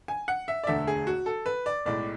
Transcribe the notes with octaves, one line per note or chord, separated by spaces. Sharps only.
G#5
F#5
E5
D5
E1 D2 D3 A3 E5
G#4
F#4
A4
B4
D5
B1 A2 G#3 D5